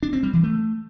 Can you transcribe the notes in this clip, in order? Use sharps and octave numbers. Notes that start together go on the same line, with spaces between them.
D4
C4
G3
E3
A3